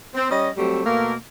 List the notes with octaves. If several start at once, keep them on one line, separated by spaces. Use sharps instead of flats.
C4
G3 C#4 D#5
F#3 G3 A3 C4
B2 A3 A#3